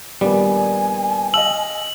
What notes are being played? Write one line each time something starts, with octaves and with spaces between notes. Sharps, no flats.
A#1 D#3 G3 B3 G#5
D#5 F5 E6 F#7